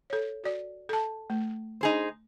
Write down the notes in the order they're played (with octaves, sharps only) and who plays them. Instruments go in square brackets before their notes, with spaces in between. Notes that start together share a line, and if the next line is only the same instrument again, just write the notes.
[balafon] A4 C#5
F#4 D5
A4 A5
A3
[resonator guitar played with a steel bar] D#4 G#4 C5